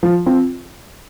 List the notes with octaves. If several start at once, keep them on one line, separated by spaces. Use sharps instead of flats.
F3
C4 F4